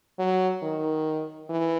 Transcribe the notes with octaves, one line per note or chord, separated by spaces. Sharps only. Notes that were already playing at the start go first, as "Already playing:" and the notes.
F#3
D#3
E3